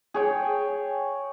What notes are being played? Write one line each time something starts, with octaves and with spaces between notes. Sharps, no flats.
G#4 C#5 G5